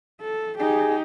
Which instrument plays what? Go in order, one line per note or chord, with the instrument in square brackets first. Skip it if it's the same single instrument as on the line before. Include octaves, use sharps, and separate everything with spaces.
[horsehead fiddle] A4
[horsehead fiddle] D#4 G4 [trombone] G#4